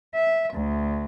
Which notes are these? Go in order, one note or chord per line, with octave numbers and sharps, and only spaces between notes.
E5
D2